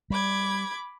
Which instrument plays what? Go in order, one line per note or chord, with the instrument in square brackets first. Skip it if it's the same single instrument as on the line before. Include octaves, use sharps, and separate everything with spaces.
[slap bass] G3 [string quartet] B5 D6 G#6